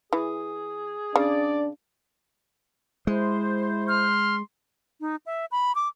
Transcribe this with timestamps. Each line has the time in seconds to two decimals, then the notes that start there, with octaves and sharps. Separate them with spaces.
0.13 E3 G#4
1.16 C#3 D4 D5
3.07 G#3 E4 C5
3.88 C6 F6
5.01 D#4
5.26 E5
5.51 B5
5.75 D6